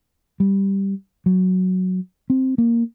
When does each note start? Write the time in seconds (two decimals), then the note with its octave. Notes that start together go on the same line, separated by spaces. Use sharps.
0.40 G3
1.26 F#3
2.30 C4
2.58 A#3